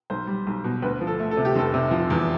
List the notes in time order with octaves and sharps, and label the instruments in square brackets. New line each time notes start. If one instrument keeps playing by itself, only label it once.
[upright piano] B1 C5
G3
B1
B2
D2 B4
F3
A4
A3
A4
C3
G4
F1 A4
C3
F3
E2